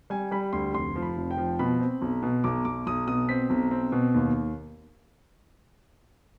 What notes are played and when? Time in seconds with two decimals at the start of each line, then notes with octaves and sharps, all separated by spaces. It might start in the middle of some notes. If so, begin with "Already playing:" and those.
0.10 G3 G#5
0.31 G3 B5
0.53 D2 C6
0.74 F1 C6
0.96 F3
1.02 B5
1.17 F1
1.31 G5
1.37 F3
1.59 B2 B5
1.80 C4
2.02 B1
2.23 B2
2.44 B1 D6
2.65 B1 D6
2.87 B1 D#6
3.07 B2 D#6
3.29 C4 B6
3.50 B1
3.71 C4
3.92 B2
4.14 D#2